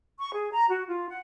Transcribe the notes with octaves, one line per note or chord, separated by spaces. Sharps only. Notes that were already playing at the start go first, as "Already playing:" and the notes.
C#6
G#4
A#5
F#4
F4
F#5